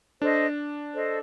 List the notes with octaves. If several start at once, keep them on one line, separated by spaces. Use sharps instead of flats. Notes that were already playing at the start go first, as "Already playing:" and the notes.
D4 A4 C5 D#5
A4 C5 D#5